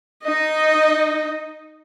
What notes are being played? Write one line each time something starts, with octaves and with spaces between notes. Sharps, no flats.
D#4 D#5